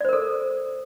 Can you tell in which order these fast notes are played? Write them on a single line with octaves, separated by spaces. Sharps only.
D5 C5 A#4 A4